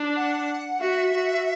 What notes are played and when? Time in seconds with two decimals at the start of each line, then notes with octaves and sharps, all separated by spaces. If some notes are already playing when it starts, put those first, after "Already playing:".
Already playing: D4
0.16 F#5
0.80 F#4 E5
1.14 F#4